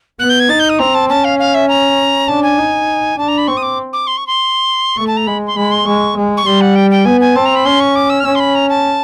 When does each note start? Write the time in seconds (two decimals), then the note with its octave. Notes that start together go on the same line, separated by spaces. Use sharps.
0.19 B3 F#6
0.29 G6
0.40 G#6
0.49 D#4 A6
0.59 G6
0.69 D#6
0.79 C4 A#5
0.94 A5
1.09 C#4 A5
1.24 F5
1.39 F5
1.54 E5
1.69 A#5
2.28 D4 A5
2.43 G#5
2.58 D#4
3.17 D4 A5
3.28 A#5
3.38 B5
3.47 C4 C#6
3.57 D#6
3.62 D6
3.93 D6
4.07 C6
4.17 C#6
4.27 C6
4.97 A3 C#6
5.07 A5
5.17 A#5
5.27 G#3 B5
5.47 C6
5.56 G#3 B5
5.71 C6
5.86 G#3 C#6
6.17 G#3
6.37 C#6
6.45 G3 C6
6.61 F#5
6.75 G5
6.91 G5
7.05 B3 G#5
7.21 G#5
7.36 C4 A5
7.45 A#5
7.56 B5
7.65 C#4 C6
7.80 C#6
7.95 D6
8.10 E6
8.20 F6
8.25 C#4 E6
8.35 C6
8.40 B5
8.55 A#5
8.69 A5